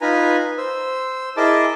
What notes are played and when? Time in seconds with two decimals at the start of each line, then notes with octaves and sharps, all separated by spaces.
0.01 D#4 F4 B4 G#5 A#5
0.58 C5 E6
1.37 E4 G#4 A#4 D#5 A5 D6